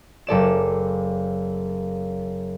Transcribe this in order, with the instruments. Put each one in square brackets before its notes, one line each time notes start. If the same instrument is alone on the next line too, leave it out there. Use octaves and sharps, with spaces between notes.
[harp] F#1 A4 D5 E7